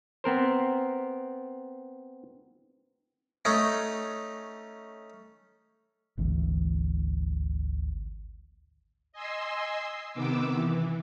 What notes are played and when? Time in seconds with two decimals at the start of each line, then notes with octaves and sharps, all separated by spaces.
0.24 B3 C4 A#4 C5
3.45 A3 C#4 D#4
6.18 G#1 D2 E3
9.13 D#5 G#5 C6 E6 C7
10.13 C3 D#3 B3 D6 E6
10.53 E3